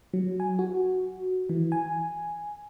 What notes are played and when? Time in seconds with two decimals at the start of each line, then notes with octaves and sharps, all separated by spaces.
0.13 F#3
0.40 G#5
0.59 F#4
1.49 E3
1.72 G#5